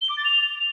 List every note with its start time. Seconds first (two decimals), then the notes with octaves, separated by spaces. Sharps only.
0.01 G7
0.09 D6
0.17 A6
0.25 F7